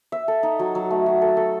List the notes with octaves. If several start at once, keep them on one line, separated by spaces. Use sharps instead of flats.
E5
A4
D#4
F#3
F#3
A3
F#4
A4
A4